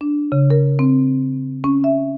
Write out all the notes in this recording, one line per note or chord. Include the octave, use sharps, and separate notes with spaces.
D4
C#3
A#4
C4
C#4
E5